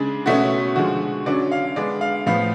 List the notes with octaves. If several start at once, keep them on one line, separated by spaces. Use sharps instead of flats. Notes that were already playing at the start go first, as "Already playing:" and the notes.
Already playing: C#3 G#3 D4
B2 A3 C#4 F#4
D3 F3 G#3 F#4
D3 F#3 C#4 D5
F5
D3 G#3 B3 D4 D5
F5
A2 F3 B3 F5